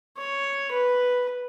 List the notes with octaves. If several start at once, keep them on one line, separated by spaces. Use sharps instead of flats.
C#5
B4